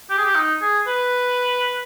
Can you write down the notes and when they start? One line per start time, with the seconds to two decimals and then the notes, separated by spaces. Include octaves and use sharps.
0.10 G4
0.18 G#4
0.25 G4
0.36 D#4
0.62 G#4
0.88 B4